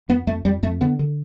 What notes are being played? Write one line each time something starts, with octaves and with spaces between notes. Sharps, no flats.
F2 B3
F2 A3
F2 G3
F2 A3
D3 B3
D3